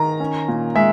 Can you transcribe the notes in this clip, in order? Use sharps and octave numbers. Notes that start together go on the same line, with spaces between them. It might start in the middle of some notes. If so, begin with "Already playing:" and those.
Already playing: D#3 A#5
C#4
A#2
G#3 E5